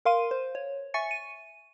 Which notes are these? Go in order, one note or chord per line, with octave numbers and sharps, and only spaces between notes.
A#4 F5 C6 D#7
C5
C#5
E5 G#5 C#6 A6 C#7
D#7